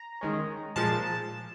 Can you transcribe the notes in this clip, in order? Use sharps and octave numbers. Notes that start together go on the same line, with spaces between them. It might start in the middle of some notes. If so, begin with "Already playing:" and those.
Already playing: A#5
D#3 G#3 C#4
A#2 F3 G#3 A5